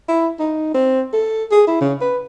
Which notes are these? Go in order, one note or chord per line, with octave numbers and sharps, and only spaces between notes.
E4
D#4
C4
A4
G#4
E4
C#3
B4